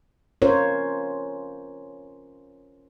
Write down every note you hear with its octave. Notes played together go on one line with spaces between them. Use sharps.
C#4 F4 A#4 C5 C#5